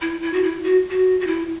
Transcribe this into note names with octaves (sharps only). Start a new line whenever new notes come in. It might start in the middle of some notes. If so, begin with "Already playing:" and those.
E4
E4
F#4
E4
F#4
F#4
F#4
E4